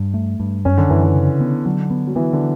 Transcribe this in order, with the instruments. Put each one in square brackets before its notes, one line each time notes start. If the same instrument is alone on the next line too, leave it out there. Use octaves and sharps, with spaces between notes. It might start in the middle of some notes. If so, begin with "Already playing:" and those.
Already playing: [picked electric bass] G2
A3
G2
[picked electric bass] F#2 [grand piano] C#4
[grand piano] D3
[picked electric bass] F#2 [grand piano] E3
[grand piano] E3
[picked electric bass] C#3
B3
[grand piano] D3 [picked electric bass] F#3
[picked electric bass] B3
[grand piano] F#3
[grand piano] E3 [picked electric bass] B3
[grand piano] D3